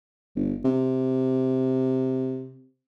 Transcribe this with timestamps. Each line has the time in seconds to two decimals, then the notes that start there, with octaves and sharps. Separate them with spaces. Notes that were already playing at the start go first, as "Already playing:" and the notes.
0.36 G1
0.65 C3